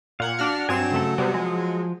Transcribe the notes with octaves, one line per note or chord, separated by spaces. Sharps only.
A#2 F5 F#5 G#6
D4 F#4 F#5 F6
G2 F#3 C4 G#5 E7
C#3 A3 A4
C3 G3 B3
F3 G#3